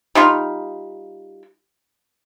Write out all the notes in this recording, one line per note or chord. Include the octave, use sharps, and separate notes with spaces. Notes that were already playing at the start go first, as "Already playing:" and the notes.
G3 D#4 F4